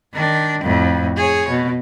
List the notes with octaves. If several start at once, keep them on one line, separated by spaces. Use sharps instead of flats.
D#3 D4
F2 A2
G#4 C#5
B2